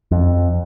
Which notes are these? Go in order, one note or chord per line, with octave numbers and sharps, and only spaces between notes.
F2